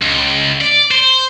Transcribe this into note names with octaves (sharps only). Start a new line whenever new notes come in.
C#2
D5
C5